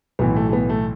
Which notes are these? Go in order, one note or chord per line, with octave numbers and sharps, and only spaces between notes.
B1 A2 E3 B3
A3
A3
B3
A3